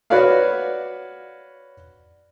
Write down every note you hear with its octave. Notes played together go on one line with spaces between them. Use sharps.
F#4 B4 C#5 D5 F5